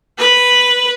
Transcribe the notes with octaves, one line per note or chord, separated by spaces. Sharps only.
B4